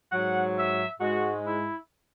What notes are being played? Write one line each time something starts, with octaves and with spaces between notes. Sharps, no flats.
G#2 F#3 F#5
E5
G#2 G#3 F#4
E4